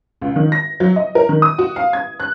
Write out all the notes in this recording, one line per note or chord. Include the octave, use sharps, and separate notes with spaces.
C#2
D#3
A#6
F#3
D#5
A#4
D#3
D#6
F#4
F5
G#6
F#6